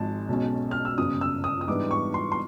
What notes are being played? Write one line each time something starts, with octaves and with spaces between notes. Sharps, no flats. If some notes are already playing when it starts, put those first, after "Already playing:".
Already playing: G#1 G#2 F3 G#3 A5
B1 B2 G#3 C#4
F6
E6
G1 F#2 C#3 D#6
E6
D#6
D#6
G#2 E3 G3 B3 D4 D6
C#6
C6
C6